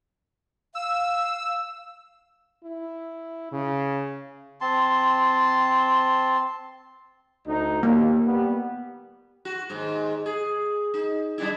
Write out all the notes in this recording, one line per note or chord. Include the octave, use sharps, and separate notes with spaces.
F5 E6
E4
C#3
C4 A5 C6
D2 D#4
D#2 A#3
G3 B3
F#4
D#2 G#2
G#4
D#4
G3 D4 E4